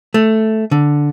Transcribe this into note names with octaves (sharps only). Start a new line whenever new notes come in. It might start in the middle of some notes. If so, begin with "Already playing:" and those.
A3
D3